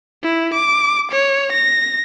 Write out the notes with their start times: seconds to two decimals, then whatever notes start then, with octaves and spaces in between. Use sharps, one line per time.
0.23 E4
0.53 D6
1.11 C#5
1.52 A#6